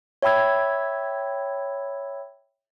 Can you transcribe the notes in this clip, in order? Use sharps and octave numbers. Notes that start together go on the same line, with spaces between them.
C#5 E5 G5 B5 E6 G#6